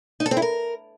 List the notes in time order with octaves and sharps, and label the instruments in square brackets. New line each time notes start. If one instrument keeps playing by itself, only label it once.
[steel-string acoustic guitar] D#4
A4
C4
E4
A#4